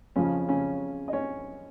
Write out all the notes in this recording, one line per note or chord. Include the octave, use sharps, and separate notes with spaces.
F2 C#3 F3 C#4
C#3 C#4
D#5
C#4 C#5